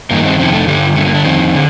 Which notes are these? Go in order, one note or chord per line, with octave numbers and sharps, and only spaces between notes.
G2 D#3 A#3
C4
F2 C3 D#3 C4
A3
G2 D3 G3
G2 D3 A3
A#3
D4
F2 D#3 C4
D3